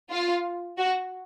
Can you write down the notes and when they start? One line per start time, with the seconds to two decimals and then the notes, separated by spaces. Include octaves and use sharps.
0.11 F4
0.78 F#4